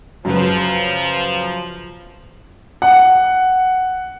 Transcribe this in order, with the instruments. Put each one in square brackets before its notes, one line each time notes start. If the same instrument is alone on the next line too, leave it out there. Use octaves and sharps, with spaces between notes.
[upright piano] F#2 C#3 B4 [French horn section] F3
[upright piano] F#5